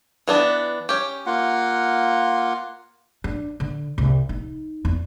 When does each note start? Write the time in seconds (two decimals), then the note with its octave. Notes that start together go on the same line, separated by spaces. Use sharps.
0.27 E3 B3 D4
0.89 C#4 G4
1.26 A#3 F4 F#5
3.24 D4
3.60 D3
3.98 C2
4.29 D#4
4.85 E2